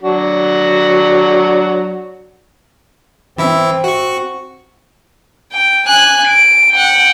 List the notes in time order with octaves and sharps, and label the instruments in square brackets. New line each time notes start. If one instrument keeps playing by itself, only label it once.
[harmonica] F#3 D4 F#4
[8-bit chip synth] E3 E4 E5 [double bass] C4
[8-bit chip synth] F#4 C#6
[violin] G5
G#5 F#6
D7
F#5 G5